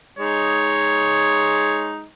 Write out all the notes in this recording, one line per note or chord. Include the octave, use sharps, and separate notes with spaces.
G#3 D#4 C#5